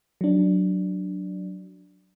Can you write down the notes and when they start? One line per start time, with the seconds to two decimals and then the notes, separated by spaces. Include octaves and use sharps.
0.21 F#3 D4